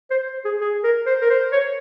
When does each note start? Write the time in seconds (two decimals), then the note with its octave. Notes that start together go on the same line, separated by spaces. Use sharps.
0.11 C5
0.45 G#4
0.61 G#4
0.83 A#4
1.06 C5
1.21 A#4
1.30 C5
1.52 C#5